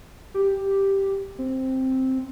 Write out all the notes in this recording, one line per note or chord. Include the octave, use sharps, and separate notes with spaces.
G4
C4